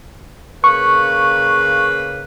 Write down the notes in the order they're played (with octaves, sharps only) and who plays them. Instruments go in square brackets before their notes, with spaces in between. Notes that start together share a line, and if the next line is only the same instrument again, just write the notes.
[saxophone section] C#3 A#3 B4 [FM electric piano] C#6